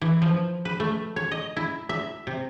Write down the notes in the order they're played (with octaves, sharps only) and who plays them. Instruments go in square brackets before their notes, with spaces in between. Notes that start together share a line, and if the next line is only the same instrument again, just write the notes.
[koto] E3
F3
B4
A3
C#5
D#5
E4
E5
C3